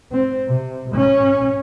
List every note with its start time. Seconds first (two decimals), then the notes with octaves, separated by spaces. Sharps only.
0.12 C4
0.48 C3
0.95 C#4